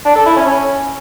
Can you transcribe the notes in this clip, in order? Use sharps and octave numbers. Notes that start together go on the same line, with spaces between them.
D4
A4
E4
C#4
C#4